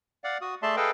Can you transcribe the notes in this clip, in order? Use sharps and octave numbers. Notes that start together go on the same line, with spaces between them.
D5 F5 F#5
F#4 D#6
A3 G#4 D5 E5 A5 C6
G#4 A4 B4 D#5 F5 G5